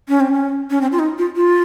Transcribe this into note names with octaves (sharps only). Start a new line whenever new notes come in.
C#4
C4
C#4
C#4
C4
F4
D#4
F4
F4